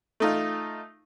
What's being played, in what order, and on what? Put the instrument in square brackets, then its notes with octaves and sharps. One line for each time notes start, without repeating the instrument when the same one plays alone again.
[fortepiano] A3 D#4 F4